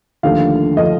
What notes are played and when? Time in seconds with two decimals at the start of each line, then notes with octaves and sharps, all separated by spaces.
0.23 D#2 D3 F3 A3 F5
0.77 D3 F3 A3 D#5